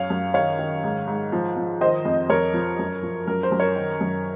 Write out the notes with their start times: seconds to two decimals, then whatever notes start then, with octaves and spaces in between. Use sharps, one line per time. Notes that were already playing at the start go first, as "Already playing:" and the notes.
Already playing: F#2 C#5 F5
0.10 F#2
0.34 D#3 C#5 F5
0.59 D#3
0.84 G#2
1.07 G#2
1.32 F3
1.57 F3
1.81 D#3 C5 D#5
2.05 F2
2.29 F2 A#4 C#5
2.54 F3
2.79 F#2
3.03 F3
3.27 F#2 A#4
3.43 C5
3.52 F#2
3.60 A#4 C#5
3.76 D#3
4.01 F#2